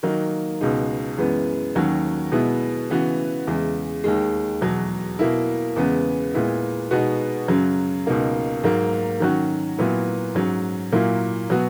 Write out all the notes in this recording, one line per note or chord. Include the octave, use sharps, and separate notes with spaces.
D#3 F#3 A#3 D#4
C#2 B2 G#3 D#4
F#2 E3 G#3 B3
D#2 D#3 F#3 C#4 F#4
B2 G#3 B3 E4
C#3 E3 B3 F#4
E2 C#3 G#3
D#2 D#3 G#3
E2 B2 F#3
B2 A#3 E4
E2 C#3 G#3 B3
A#2 G#3 B3 E4
B2 G#3 B3 D#4 F#4
F#2 C#3 F#3
C#2 B2 A#3 D#4
G#2 F#3 A#3
D#3 F#3 C#4 F#4
A#2 F#3 B3 E4
G#2 F#3 C#4
A#2 F#3 A#3 E4
B2 F#3 B3 F#4